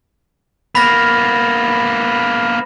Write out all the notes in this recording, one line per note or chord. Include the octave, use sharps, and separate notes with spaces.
A#3 B3 B5 A#6